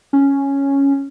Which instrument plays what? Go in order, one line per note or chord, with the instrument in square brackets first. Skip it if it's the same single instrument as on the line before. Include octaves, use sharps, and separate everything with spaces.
[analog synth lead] C#4